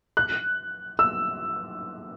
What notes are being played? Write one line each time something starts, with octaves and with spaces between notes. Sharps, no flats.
F#6
E6